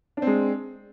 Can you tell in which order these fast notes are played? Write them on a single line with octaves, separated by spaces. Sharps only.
D4 C4 G#3